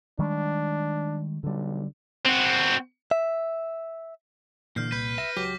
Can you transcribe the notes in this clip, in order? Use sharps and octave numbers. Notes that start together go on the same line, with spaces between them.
D#3 G3 G#3 D4
B1 D3 G3
C4 F#4
E5
A#2 D3 E3 F6 G6 C7
C2 B4 G6
E5 A#6
C#2 F#3 G4 D6 G6 B6